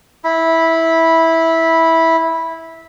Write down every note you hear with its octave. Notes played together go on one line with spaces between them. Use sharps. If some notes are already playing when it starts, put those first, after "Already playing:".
E4 B5